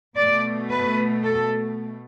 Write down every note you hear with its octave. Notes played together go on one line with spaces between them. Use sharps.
B2 A3 D5
B4
A4